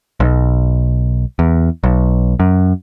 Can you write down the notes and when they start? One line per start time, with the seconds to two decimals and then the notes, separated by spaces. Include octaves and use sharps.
0.20 B1
1.39 E2
1.84 B1
2.40 F#2